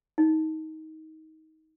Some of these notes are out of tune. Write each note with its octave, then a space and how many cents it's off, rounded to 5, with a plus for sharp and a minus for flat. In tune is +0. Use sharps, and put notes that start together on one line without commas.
D#4 +20